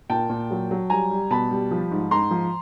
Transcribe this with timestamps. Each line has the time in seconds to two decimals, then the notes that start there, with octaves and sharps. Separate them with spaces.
0.10 A#2 G5 A5
0.29 A#2
0.51 F#3
0.71 F#3
0.90 G3 G#5 A#5
1.10 G3
1.30 B2 A5 B5
1.50 G3
1.71 F3
1.91 G#2
2.11 G#2 A#5 C6
2.31 F3